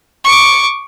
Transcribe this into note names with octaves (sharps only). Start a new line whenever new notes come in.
C#6 D6